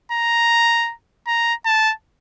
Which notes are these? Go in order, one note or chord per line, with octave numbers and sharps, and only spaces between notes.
A#5
A#5
A5